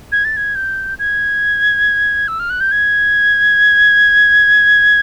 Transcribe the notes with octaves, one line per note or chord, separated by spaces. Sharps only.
G#6
A6
G#6
G6
G#6
E6
F6
F#6
G6
G#6